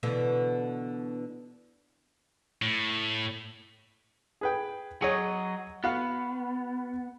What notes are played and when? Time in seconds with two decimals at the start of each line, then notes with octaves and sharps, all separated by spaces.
0.03 B2 D3 E3
2.62 A2
4.41 G#4 B4 G5
5.02 F#3 G#4 C#5 D#5
5.84 B3 F#4 F5